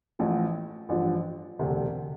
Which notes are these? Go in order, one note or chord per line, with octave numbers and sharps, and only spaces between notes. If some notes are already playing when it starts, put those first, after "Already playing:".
A1 A2 F3
A1 G2 F3
E1 D2 C3